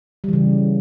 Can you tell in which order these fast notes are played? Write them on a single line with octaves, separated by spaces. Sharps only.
G3 E3 C#3